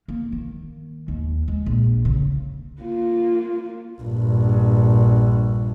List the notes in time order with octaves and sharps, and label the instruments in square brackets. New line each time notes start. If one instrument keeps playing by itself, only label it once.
[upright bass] A#3
D#3
D#2
G#3
A#1
C#3
[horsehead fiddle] A#3 F4
[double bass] A#1 G2